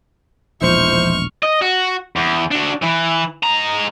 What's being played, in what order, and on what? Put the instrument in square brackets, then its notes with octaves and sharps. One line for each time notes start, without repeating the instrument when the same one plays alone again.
[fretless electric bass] E1 A#1 [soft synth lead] F3 [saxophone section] D#4 E4 C5 [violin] C#6 F6
[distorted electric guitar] D#5
F#4
E2
D4 F#4
E3
G#3 A#5